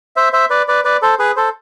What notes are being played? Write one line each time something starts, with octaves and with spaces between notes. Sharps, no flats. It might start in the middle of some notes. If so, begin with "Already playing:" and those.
C5 E5
C5 E5
B4 D5
B4 D5
B4 D5
A4 C5
G#4 B4
A4 C5